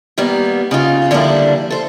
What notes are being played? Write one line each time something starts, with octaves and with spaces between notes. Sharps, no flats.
D#3 G3 A#3 B3
C#3 D#4 F4
D3 F3 G3 A#3 D4 E4
A4 C5